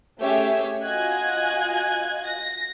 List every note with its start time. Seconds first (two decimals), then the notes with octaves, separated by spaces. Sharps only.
0.19 A3 C#4 G4 G#4 C#5 E5
0.84 F4 F#4 D#5 G#5 F#6 G#6
2.26 A#6